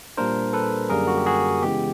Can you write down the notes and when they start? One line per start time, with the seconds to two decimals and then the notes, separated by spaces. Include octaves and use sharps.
0.17 A#2 G3 A#3 D4 A#4 C5
0.53 A4 B4
0.89 F#2 D3 G3 A#3 G#4 A#4
1.07 F#4
1.18 G4
1.26 F#4 G#4
1.62 C#3 E3 G#3 B3 G4